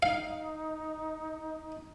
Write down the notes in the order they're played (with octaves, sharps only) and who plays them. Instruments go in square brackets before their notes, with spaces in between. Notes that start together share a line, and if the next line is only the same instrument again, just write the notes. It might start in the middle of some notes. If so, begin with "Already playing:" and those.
[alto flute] D#4 [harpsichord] F5